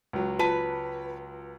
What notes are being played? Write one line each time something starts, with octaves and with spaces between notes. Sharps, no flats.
C#2 F#3
F4 B4 A5